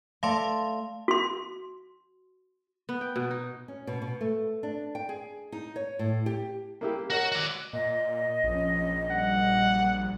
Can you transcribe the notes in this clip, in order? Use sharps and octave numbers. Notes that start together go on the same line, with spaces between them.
A3 D5 F5 A5 C6
F#4 C6
B3
G5
B2
D#4
C#4
B2
B2
A3
D4
G5
G#4
D#4
C#5
A2
G4
A#3 E4 G4
A#3
F#4 A#4 C#5 D#5
F#4 D5
A#2 D#5
A#1 F3 C#4
A#2 G3 F#5